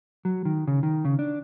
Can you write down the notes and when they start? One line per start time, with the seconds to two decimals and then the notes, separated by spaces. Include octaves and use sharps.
0.25 F#3
0.45 D#3
0.67 C#3
0.83 D#3
1.05 C#3
1.19 D4